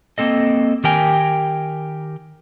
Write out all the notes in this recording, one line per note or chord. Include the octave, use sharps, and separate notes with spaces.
A#3 C4 A4 D#5
D#3 G4 A#4 G5 G#5